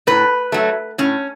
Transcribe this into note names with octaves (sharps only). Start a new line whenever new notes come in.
A2 B4
F#3 A3
A2 C#4